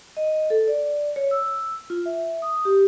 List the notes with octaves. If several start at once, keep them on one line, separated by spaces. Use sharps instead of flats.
D#5
A4
D5
C#5
E6
F4
E5
D#6
G4